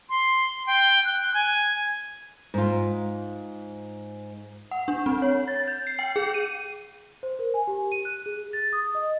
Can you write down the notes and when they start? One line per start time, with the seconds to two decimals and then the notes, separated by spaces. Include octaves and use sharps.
0.09 C6
0.67 G5
1.05 F#6
1.34 G#5
2.54 G#2 F4
4.71 F#5
4.88 D4
5.06 C4
5.22 C#5
5.48 A6
5.68 G6
5.87 C7
5.99 G5
6.16 G#4
6.34 D#7
7.23 C5
7.39 A#4
7.54 G#5
7.67 G4
7.92 D#7
8.05 F#6
8.26 G#4
8.53 A6
8.73 D#6
8.95 D#5